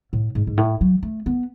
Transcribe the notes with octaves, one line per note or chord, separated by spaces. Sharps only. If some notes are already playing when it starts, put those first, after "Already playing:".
A2
G#2
G#2
A2
F#3
A3
B3